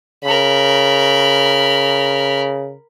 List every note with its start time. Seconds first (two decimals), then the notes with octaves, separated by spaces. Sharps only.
0.24 C#3 A#4 B5